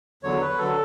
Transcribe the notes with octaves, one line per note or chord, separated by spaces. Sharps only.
E2 D3 F#3 C#5
B4
D3 F#3 A4